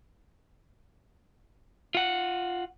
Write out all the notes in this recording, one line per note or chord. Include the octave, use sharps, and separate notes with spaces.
F4 F#5